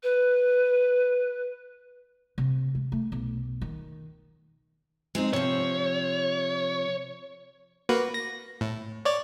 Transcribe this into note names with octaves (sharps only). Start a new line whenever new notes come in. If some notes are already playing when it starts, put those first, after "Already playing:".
B4
C3
G#3
A3
B1
D#3
G#3 C4 D#4
C3 F3 C#5
A#3 F#4 B4
A#6
A2
C#5 D5